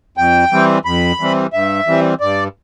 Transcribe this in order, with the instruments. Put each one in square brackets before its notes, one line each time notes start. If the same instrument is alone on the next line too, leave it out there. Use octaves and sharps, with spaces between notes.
[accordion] F2 G5
E3 G3 C4
F2 B5
E3 G3 C4
G2 E5
E3 G3 C4
G2 D5